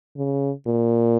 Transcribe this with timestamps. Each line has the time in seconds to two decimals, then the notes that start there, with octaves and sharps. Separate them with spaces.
0.17 C#3
0.66 A#2